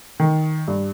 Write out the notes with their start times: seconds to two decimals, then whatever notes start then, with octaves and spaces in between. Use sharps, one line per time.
0.20 D#3
0.68 G2